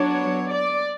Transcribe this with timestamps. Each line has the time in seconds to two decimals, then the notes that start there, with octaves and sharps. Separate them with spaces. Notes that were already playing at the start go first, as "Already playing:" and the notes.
Already playing: F#3 B3 D4 C#5
0.51 D5